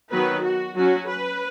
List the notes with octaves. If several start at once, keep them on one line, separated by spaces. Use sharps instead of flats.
D#3 F#3 B3 B4
F#4
F#3 C#4 F#4
B4